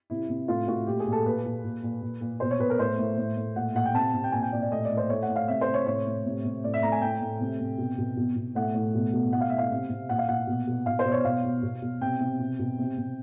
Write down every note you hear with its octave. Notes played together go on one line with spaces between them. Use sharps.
C3 E4
C3
A2 F4
A2 F#4
A#2 G4
G#4
A#2
A4
A#2 B4
A#2
A#2
A#2
A#2
A#2
B2 C5
C#5
B2 B4
A#4
A2 C5
A2
A2
A2
A#2 F#5
A#2 F#5
G5
C3 A5
C3
G5
A#2 G#5
G5
A#2 D5
D5
A2 D#5
D5
A2
C5
A2 C#5
F#5
A2
F5
C3 E5
C5
C3
C#5
A2 C#5
A2
C3
C3
A2 D5
E5
A2 A#5
G#5
A2 G5
A2
C3
C3
B2
B2
B2
B2
A2 F#5
A2
B2
B2
A2 F#5
F5
A2 E5
F5
C3
C3
A#2 F#5
F5
A#2 F#5
B2
B2
B2 F5
C5
B2 D5
C#5
B2 F5
B2
B2
B2
C3 G5
C3
B2
B2
C3
C3